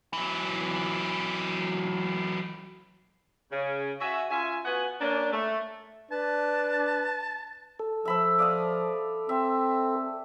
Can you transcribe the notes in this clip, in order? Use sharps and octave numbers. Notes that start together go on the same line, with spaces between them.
E3 F#3
C#3
F#4 E5 G#5
C#4 F4 E5 G#5
B3 F#4 B4 F#5 G#5
A#3 C#4 D4
A3
D4 B4 A5
A4
F3 E5 B5 E6
D5 F5 D#6
C4 E5